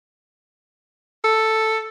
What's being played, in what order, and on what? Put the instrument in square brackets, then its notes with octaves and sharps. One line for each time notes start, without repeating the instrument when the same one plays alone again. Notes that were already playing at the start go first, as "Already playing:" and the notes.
[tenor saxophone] A4